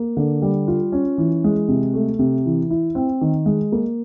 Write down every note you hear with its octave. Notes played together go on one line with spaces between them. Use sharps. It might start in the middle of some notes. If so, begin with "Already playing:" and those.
Already playing: A#3
D3
G3
F4
C#4
E3
G#3
C3
A3
C3
E3
E4
C4
D#3
G#3
A#3